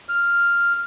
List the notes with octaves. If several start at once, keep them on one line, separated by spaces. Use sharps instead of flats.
F6